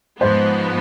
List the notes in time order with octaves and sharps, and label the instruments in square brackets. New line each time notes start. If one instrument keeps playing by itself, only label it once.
[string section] G#2 F3 G#3 B3 [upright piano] C5